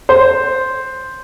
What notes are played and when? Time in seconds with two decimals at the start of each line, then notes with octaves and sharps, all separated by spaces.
0.09 C5